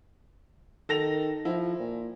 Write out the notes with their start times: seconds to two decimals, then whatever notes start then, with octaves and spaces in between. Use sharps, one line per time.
0.89 D#3 A4 A#6 F7
1.45 F3 E4
1.79 A#2